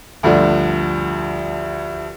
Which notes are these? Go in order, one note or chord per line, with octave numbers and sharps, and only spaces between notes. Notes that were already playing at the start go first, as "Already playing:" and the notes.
D2 G2 D3 F3